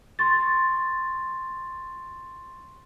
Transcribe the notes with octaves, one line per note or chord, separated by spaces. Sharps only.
C6 C#6 A6